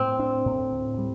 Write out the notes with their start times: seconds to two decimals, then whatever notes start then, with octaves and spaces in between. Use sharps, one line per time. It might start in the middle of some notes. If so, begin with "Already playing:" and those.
Already playing: A2 C4
0.19 D4
0.46 A2
0.72 D2
0.98 G3